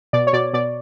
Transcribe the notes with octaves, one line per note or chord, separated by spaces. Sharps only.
B2 D5
C#5
B2 D5
B2 D5